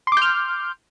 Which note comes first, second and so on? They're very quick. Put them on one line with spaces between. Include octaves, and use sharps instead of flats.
C6 D6 G6 F6